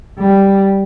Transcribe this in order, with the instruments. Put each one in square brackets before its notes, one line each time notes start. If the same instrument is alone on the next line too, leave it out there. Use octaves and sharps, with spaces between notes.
[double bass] G3